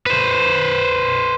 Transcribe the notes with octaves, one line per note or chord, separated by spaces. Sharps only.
B4 C5